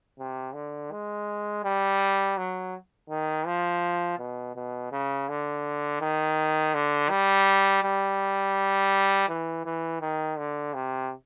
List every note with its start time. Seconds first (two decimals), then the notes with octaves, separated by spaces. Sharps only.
0.19 C3
0.54 D3
0.91 G#3
1.64 G3
2.37 F#3
3.10 D#3
3.46 F3
4.19 B2
4.56 B2
4.92 C#3
5.29 D3
6.01 D#3
6.74 D3
7.10 G3
7.84 G3
9.29 E3
9.65 E3
10.01 D#3
10.38 D3
10.74 C3